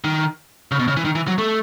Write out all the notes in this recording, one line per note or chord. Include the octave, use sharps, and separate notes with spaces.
D#3
C#3
B2
C#3
E3
D#3
E3
F#3
A3